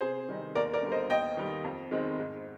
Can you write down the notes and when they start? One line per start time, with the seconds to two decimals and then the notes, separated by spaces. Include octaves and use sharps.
0.01 C3 G#4 C5
0.28 D#3 G3 C4 D#4
0.55 D#2 A#4 D5
0.73 A#4 D5
0.82 D3 G3
0.92 C5 D#5
1.10 D#2 D#5 G5
1.37 D#3 G3
1.64 F2
1.91 D#3 G#3 C4 D#4
2.18 G#2